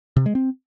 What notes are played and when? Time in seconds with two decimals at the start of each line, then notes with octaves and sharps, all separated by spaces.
0.17 C3
0.26 G#3
0.35 C4